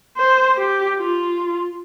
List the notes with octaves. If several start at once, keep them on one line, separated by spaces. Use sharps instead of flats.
C5
G4
F4